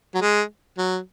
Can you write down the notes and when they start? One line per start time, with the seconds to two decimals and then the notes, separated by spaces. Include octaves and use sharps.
0.15 F#3
0.22 G#3
0.78 F#3